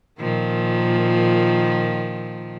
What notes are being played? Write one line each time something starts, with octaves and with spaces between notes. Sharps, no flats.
A#2 D#3 F3